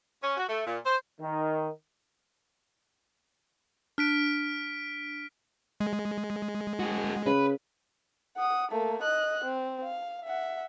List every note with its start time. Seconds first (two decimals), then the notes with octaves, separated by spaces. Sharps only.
0.23 C#4
0.37 F#4
0.49 A3
0.66 A#2
0.84 C5
1.20 D#3
3.98 D4 F6 B6 D7
5.80 G#3
6.80 F#4 G#4
7.26 C#3 B4
8.37 F#5 D#6
8.71 A3 A#3
9.02 D#5 F#6
9.44 C4
9.83 F5
10.25 E5 F#5